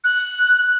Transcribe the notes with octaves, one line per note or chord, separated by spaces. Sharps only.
F#6